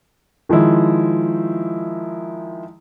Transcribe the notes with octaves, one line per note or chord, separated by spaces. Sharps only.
D#3 F3 G#3 E4